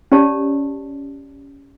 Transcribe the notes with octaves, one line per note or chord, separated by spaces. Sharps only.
C#4 G4 C#5 D5 A5